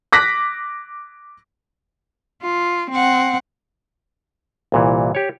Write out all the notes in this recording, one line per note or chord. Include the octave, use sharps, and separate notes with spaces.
D6 F#6 A#6 B6
F4
C4 F#5
C2 A#2 E3
G4 C#5